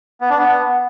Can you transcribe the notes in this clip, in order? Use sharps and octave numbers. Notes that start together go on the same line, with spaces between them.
B3
D4
B3